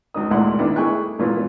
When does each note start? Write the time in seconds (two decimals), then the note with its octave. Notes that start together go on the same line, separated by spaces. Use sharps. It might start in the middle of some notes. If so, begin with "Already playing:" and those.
0.14 C#2 D#4 D#6
0.31 G#1 D2 A#2 E4 F#5 C6
0.59 D#3 A3 B3 D4 E4
0.76 A3 E4 G#4 G5 C#6 F#6
1.19 G#1 A#2 E3 B3 F4